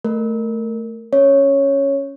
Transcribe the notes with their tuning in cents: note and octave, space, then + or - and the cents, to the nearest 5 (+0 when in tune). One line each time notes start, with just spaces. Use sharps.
A3 +0 A#4 -15
C#4 +0 C#5 +0